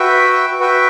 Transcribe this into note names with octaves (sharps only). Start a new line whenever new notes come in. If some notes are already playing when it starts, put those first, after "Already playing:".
Already playing: F#4 B4 E5 G5
F#4 B4 E5 G5